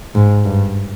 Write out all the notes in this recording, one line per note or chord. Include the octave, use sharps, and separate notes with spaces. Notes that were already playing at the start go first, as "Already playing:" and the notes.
G#2
G2